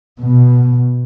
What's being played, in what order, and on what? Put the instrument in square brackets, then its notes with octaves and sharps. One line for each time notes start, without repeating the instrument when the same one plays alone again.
[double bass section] B2